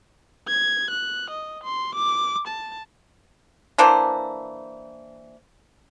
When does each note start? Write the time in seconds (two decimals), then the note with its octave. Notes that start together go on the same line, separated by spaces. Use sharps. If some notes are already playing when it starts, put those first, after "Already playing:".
0.48 G#6
0.91 F#6
1.30 D#5
1.64 C6
1.95 D6
2.48 A5
3.78 E3 A#3 D4 C5